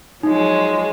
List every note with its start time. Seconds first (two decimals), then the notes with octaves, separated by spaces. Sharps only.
0.23 F3 F#3 G#3 D#4